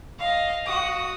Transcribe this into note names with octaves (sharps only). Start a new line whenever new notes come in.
D#5 F5
F#4 D#6